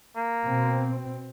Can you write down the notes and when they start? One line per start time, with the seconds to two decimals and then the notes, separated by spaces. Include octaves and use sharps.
0.16 A#3
0.45 B2 C4